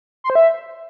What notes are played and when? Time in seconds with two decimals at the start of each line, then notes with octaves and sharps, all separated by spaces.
0.24 C6
0.30 C5
0.35 E5